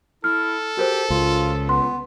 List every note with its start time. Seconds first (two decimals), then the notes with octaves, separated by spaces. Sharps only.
0.24 E4 A4 F6
0.77 F#4 G4 A#4 C5
1.10 C#2 F4
1.69 B3 C6